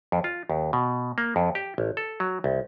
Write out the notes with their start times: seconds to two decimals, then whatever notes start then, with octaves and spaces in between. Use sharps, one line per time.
0.12 F2
0.24 F4
0.50 D#2
0.73 B2
1.18 A#3
1.36 F2
1.55 G4
1.78 A1
1.97 A4
2.20 F#3
2.44 C2